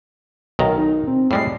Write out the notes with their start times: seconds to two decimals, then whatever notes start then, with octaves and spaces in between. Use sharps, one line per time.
0.59 B1 D#3 A#4 A#5
0.78 D#4
1.07 C4
1.31 A2 G3 G#3 C7